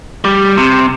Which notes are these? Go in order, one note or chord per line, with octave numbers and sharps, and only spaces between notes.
G3
C3